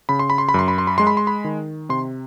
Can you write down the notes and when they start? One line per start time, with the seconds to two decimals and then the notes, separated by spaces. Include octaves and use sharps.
0.09 C#3 B5
0.19 C6
0.30 B5
0.38 C6
0.49 B5
0.54 F#2 C6
0.68 B5
0.78 C6
0.87 B5
0.98 G#3 C6
1.07 B5
1.17 C6
1.27 B5
1.44 D#3
1.89 C3 C6